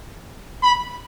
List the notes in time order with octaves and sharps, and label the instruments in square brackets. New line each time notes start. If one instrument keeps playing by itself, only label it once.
[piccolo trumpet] B5